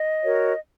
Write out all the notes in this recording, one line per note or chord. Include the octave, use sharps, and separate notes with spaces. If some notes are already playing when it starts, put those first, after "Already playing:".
Already playing: D#5
F#4 A#4 C#5